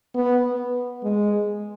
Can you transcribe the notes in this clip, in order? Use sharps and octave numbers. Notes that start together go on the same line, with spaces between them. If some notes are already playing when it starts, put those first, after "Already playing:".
B3
G#3